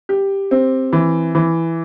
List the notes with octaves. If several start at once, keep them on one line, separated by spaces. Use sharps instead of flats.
G4
C4
E3
E3